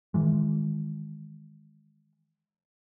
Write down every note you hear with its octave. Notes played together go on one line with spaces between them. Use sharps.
D#3 E3 G#3